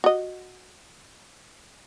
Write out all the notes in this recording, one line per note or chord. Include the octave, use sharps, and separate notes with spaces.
F#4 D#5